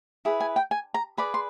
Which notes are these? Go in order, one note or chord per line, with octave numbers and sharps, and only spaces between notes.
E4 G#4 B4
G#5
G5
G#5
A#5
G#4 B4 D5 B5
C6